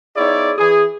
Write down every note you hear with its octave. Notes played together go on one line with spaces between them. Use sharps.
B3 D#4 E4 G#4 C#5 D5
E3 G#4